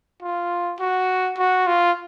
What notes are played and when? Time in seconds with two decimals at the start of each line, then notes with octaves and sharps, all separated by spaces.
0.23 F4
0.80 F#4
1.38 F#4
1.67 F4